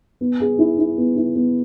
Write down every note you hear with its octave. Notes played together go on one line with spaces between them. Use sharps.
B3
G#4
E4
E4
B3
E4
B3